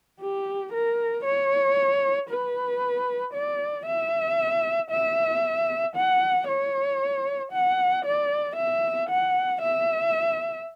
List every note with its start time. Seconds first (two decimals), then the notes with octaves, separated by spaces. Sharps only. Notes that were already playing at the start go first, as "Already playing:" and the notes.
0.21 G4
0.73 A#4
1.24 C#5
2.30 B4
3.34 D5
3.86 E5
4.91 E5
5.96 F#5
6.48 C#5
7.52 F#5
8.05 D5
8.56 E5
9.09 F#5
9.62 E5